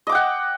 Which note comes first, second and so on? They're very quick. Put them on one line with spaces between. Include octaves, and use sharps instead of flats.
D#5 D6 G5 F#5